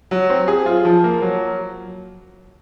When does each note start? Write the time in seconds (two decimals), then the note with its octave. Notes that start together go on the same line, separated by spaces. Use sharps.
0.11 F#3
0.30 C4
0.48 G#4
0.66 F4
0.85 F3
1.04 A#3
1.22 F#3